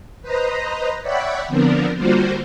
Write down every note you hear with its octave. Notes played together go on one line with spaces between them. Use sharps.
B4 C5 D#5 A#5
C#5 D5 E5 F#5 G5 B5
D3 F3 B3 C4 D4 A#4
D3 G3 A#3 F4 F#4 C5